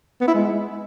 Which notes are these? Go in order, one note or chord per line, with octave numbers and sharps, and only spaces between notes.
B3
E4
G#3